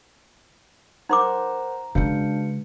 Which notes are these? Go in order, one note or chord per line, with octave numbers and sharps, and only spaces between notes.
D#4 A#4 C5 F#5 A#5 C6 D6
C#3 G#3 D4 F#4 B4 F5 G6 C#7